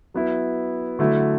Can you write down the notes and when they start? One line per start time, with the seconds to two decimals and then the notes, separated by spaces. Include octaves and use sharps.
0.14 F#3 B3 E4
0.99 D3 F#3 A3 E4